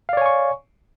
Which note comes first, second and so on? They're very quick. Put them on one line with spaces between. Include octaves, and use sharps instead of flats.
F5 D5 C#5 G#5 C#6